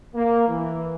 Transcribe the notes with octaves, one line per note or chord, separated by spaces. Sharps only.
A#3
E3